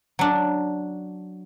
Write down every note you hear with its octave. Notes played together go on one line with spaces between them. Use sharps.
F#3 D4